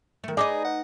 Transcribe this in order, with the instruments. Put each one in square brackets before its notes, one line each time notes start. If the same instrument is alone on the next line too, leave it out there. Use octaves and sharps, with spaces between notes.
[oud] D#3 A3
[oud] D#4 B4 D#5 [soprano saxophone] G#4 [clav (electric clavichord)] D5
[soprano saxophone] F#5